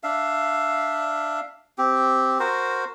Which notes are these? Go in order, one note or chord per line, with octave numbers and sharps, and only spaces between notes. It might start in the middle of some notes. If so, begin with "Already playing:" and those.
D4 E5 F5
C4 G4
F#4 A#4 C5